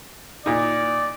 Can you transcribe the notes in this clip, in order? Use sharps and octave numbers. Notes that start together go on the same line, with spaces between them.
A#2 D#4 D5